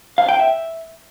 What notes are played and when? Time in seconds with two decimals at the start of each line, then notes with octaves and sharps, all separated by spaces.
0.18 F5
0.29 G5
0.39 E5